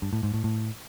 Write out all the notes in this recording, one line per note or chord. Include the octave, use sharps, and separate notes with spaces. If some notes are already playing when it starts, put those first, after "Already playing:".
G2
A2
G#2
A2
A2